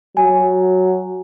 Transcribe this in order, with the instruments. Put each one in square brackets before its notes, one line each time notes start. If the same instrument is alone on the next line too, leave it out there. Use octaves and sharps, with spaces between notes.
[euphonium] F#3 [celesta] G#5